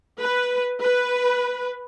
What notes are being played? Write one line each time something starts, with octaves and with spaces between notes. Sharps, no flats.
B4
B4